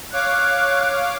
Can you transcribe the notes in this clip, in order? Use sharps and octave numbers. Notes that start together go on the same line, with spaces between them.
C#5 F5 D6 F#6